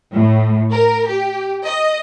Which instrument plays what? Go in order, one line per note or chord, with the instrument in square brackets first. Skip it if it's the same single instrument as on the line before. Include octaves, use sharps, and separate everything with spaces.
[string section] A2
A#4
G4
D#5